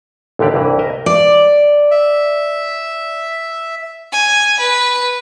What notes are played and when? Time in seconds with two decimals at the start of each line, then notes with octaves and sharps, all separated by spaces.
0.39 A1 D#2 D3 G4 D5
0.54 C2 G2 E3
0.79 A#4 D#5 E5
1.06 D5
1.91 E5
4.12 G#5
4.59 B4